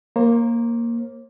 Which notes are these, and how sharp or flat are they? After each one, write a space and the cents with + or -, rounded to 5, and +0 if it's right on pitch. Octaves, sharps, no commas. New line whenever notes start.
A#3 +0 C5 +45